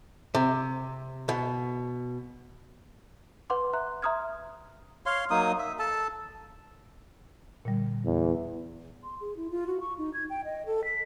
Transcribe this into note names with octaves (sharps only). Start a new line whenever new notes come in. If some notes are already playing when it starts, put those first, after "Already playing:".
C3
B2
B4 F#5 C6 D6
E5 A#5 C6 F#6
E5 A#5 C6 D#6 F6 G#6
C#5 F5 C6
F#3 A#3 D#4 D#6
E5
A4 A5
A#2 D3 G3
E2
C6
G#4
E4
F4
F#4
C#6
D#4
G#6
G5
D#5
A4
B6